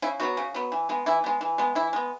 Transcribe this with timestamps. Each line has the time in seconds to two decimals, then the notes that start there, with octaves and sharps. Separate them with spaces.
0.02 C#3 E4
0.20 F#3 B3 F#4
0.37 C#3
0.54 F#3 B3
0.72 E3
0.89 G#3 B3
1.06 E3 E4
1.24 G#3 B3
1.41 E3
1.58 G#3 B3
1.75 E3 E4
1.93 G#3 B3